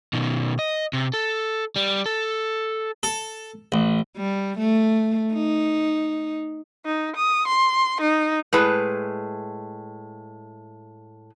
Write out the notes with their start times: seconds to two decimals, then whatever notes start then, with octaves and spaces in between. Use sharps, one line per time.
0.13 B2 D#3
0.59 D#5
0.93 C3
1.14 A4
1.76 G3
2.06 A4
3.03 A4
3.72 A1
4.17 G3
4.58 A3
5.33 D#4
6.85 D#4
7.16 D#6
7.48 C6
8.01 D#4
8.53 A2 G#3 G#4 B4